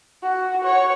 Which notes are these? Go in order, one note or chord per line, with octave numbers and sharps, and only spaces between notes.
F#4
C#5 F#5